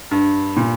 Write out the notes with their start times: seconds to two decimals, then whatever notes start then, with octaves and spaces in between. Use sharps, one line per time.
0.11 G2
0.57 A#2